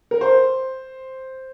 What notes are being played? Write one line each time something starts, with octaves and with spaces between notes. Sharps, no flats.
A#4
C5